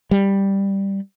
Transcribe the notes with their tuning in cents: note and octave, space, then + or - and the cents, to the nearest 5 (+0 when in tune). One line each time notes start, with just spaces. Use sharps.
G3 +5